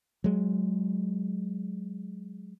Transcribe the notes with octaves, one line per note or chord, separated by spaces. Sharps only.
F#3 G#3